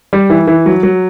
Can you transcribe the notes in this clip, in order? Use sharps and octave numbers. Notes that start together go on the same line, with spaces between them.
G3
E3
E3
F#3
F#3